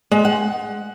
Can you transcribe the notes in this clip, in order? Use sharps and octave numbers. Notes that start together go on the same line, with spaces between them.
G#3
F#5